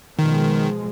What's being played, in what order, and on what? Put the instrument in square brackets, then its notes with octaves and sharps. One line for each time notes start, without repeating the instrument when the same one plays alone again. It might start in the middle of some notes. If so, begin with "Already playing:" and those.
[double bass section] B2 F3 G#3 [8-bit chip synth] D#3